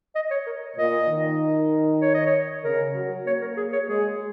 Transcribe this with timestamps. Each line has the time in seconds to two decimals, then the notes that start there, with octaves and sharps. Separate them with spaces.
0.15 D#5
0.30 C#5
0.46 A#4
0.77 A#2 D#5
1.08 D#3
2.01 C#5
2.14 D#5
2.26 C#5
2.64 C#3 A#4
2.95 F#3
3.26 A#3 C#5
3.41 A#4
3.57 G#4
3.72 C#5
3.88 G#3 G#4